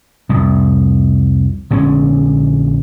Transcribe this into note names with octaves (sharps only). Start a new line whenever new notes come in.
C2 F2
A#1 D3 G#3 C#4